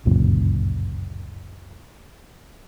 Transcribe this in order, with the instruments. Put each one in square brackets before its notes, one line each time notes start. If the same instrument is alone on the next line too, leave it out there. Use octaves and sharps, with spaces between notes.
[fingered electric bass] G1 C#2 F#2 A#2